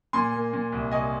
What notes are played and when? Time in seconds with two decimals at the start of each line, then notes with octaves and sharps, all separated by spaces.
0.13 A#2 G#5 C6
0.33 A#3
0.53 A#2
0.72 C2
0.91 C2 D#5 G#5